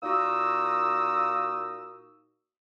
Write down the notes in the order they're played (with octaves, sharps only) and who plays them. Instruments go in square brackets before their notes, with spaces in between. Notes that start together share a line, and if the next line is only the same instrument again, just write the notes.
[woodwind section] A#2 A#3 D#4 F#4 D#6 E6